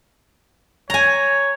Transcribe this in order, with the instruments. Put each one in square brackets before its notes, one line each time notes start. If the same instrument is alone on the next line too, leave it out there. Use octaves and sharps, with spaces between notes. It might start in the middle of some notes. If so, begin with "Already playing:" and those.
[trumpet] C#5 [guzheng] G#5 A#5